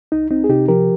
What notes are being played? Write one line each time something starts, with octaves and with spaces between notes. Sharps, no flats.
C2 D#4
C4 D#4
G#4
C3 D#4 G4
F3 G4 A#4